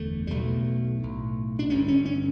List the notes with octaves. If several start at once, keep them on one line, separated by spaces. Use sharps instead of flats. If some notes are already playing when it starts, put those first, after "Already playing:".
Already playing: F#1 E2 D3 A3
G3
B1 B2 A3
B1 A2
D4
G1 G2 D3 C#4
C#4
C#4